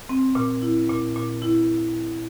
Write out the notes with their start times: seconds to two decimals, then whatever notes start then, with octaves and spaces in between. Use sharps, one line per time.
0.09 C4
0.35 A#2
0.62 E4
0.89 A#2
1.16 A#2
1.42 E4